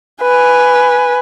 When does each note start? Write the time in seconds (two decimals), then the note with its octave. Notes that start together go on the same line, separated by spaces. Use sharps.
0.22 B4 G#5